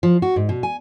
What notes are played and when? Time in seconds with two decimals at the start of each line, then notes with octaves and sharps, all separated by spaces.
0.03 F3
0.22 F#4
0.36 G#2
0.49 B2
0.63 G#5